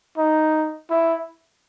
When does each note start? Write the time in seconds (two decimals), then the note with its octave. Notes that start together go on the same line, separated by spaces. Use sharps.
0.17 D#4
0.90 E4